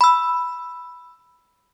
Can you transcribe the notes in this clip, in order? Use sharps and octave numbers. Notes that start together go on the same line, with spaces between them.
B5 E6